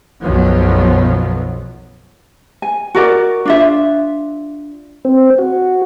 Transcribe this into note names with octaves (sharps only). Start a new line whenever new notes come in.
B1 F#2 F3 F#3 B3
G#5
F#4 A#4 D5
D4 F4 E5
C4
F#4